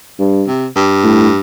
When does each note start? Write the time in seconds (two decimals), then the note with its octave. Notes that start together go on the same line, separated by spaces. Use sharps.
0.19 G2
0.47 C3
0.75 G2
1.04 A2